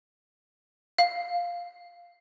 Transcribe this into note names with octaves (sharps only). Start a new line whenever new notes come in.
F5